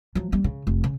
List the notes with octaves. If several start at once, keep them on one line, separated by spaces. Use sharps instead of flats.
F3 F#3
G3 B3
C#3
F1
C#3